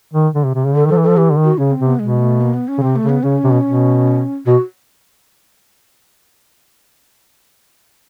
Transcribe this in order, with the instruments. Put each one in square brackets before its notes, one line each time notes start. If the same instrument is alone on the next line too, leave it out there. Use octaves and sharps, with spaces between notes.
[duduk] D#3
D3
C3
C3
C#3
[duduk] D3 [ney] A4
[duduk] D#3
[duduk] F3 [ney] A4
[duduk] E3
[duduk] F3 [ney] A4
[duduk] E3 [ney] G4
[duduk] D3
D#3
[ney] F#4
[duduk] C#3 [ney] C#4
[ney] C4
[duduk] C3
[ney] B3
[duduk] B2 [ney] G#3
[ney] A3
A#3
B3
C#4
[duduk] C#3
[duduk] C3 [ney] C4
[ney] A3
[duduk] C#3
[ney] B3
[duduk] C#3 [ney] C#4
[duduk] C3
B2
B2
[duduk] B2 [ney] F#4